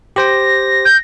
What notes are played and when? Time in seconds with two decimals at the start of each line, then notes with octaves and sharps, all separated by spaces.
0.16 G4 C5 G5 A#6
0.85 G6